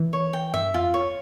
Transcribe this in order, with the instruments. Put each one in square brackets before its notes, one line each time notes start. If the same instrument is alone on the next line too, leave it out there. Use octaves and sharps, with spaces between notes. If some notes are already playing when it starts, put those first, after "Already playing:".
Already playing: [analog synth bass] E3
[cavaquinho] C#5
G5
[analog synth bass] G2 [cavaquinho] E5
[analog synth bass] F2 [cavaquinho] F4
[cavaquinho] C#5